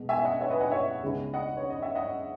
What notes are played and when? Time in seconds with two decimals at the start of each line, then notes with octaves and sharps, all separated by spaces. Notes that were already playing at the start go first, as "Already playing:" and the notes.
Already playing: B2 G#3 B3
0.09 E5 G#5
0.19 E5
0.24 D#5 F#5
0.41 C#5 E5
0.50 B4 D#5
0.60 D#5 F#5
0.71 C#5 E5
1.03 C#2 C#3 G#3 B3 D#4
1.33 D#5 F#5
1.57 C#5
1.70 D#5
1.82 E5
1.95 D#5 F#5